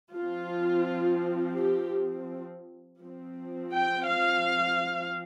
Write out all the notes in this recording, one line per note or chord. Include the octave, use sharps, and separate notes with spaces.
F3 C4 F4
G4
F3 C4
G5
F5